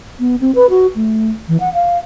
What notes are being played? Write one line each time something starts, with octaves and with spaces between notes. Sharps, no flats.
B3
C4
B4
F#4
A3
E3
F#5
F5